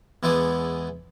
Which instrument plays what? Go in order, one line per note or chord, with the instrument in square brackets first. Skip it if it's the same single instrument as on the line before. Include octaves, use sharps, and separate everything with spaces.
[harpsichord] E2 E3 G#3 B3 E4 D6